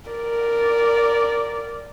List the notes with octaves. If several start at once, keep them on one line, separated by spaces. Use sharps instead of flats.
A#4 D5